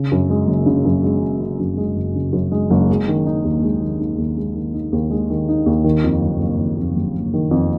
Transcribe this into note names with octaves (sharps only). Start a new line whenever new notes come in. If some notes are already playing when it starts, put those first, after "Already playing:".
Already playing: C#3
F#2
G#3
F#1
C#3
F#2
G#3
F#1
C#3
F#2
G#3
F#1
C#3
F#2
G#3
F#1
G#3
D#3
D#4
D#2
G#3
D#3
D#4
D#2
G#3
D#3
D#4
D#2
G#3
D#3
D#4
D#2
D#3
F2
F#1
F#1
D#3
F2
F#1
F#1
D#3
F2